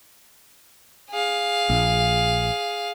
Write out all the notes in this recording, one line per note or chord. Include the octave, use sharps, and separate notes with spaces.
G#4 F5
A#1